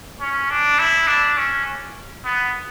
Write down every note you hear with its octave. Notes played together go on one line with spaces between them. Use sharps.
C#4
D4
E4
D4
C#4
B3